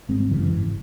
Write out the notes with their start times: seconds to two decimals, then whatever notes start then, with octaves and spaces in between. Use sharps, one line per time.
0.09 G#1 G#3 C4
0.20 G#3 C4
0.30 F#2 C#3 E3
0.41 E3
0.51 G#1